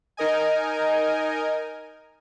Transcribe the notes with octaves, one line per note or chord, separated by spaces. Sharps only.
D#4 A#4 D#5 G#5